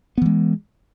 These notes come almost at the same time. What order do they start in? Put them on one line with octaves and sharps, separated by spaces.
B3 E3 G#3